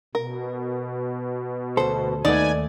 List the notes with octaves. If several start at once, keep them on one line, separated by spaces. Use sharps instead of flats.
B2 A#4
D2 A4 C5
D#2 A3 B3 D#4 D5 G#5